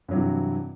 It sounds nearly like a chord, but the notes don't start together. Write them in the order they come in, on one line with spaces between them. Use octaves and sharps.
G2 F#3 C3 E3